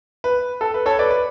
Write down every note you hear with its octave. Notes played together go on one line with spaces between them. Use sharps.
B4
A4
B4
A4 C#5
B4 D5
B4